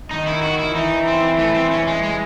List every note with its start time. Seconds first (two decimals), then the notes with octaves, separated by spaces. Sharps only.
0.11 D#3 D#4
0.27 E4
0.42 F#4
0.59 E4
0.75 E3 D#4
1.07 C4
1.39 A3
1.54 C4
1.71 C#4
1.87 G#3
2.03 G#3